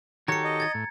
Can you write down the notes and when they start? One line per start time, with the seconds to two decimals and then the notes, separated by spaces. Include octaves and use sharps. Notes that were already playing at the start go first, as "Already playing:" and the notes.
0.28 D#3 F#4 G4 A4 C#5 A#5 C#7
0.44 D#5
0.60 G#6 A6
0.74 A2